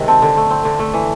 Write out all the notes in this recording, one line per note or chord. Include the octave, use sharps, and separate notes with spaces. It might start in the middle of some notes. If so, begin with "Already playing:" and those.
Already playing: C3 D#3 G#3
C4 A5
D3
A3
C4
D3
A3
E3